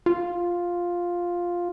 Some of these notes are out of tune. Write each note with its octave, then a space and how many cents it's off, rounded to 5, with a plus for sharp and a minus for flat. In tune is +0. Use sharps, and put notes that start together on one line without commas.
F4 +5